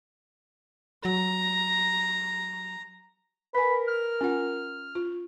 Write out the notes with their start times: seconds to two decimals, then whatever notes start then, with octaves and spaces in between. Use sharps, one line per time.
1.05 F#3 A#5
3.55 A#4 B4 G#5 B5
3.88 F6
4.21 C#4 F4 F#5
4.95 F4